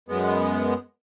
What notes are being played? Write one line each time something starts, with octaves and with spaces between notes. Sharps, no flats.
F#2 G#3 B3